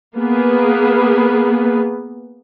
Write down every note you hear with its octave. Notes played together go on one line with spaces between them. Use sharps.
A#3 B3 G#4 B4